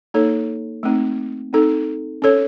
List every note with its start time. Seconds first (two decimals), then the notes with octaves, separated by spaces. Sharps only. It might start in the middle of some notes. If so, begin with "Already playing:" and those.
0.14 A#3 D#4 A4 C#5
0.83 A3 C4 D#4
1.53 C4 D#4 A4
2.22 C#4 A4 C#5